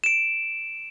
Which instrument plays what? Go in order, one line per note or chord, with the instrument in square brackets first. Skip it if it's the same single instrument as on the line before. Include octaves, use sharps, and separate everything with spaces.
[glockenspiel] D7 E7